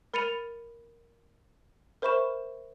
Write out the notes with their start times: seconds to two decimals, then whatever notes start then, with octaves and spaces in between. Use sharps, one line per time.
0.14 A#4 B5 A6 C#7 D#7 F7
2.02 A#4 C5 E5 B5 C#6 E7